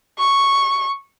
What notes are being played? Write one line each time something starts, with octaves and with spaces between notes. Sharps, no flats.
C#6